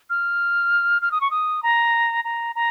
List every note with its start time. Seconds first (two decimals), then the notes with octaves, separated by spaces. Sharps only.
0.10 F6
1.02 F6
1.11 D#6
1.21 C#6
1.31 D#6
1.63 A#5
2.25 A#5
2.55 A#5